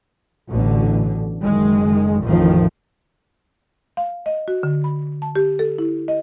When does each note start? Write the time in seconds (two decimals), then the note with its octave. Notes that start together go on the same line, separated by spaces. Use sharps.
0.51 A1 B2 D3
1.42 F#1 D#3 G#3
2.21 A1 F2 D#3 F3
3.97 F5
4.26 D#5
4.48 F#4
4.63 D3
4.84 B5
5.22 A5
5.35 G4
5.59 A4
5.78 E4
6.08 D#5